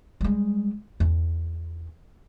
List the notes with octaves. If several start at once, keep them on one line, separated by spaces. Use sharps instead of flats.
G3 G#3
E2